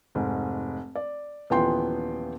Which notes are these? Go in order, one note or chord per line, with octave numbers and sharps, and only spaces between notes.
F1 G#2
D5
D#1 E3 F3 B3 G5 C6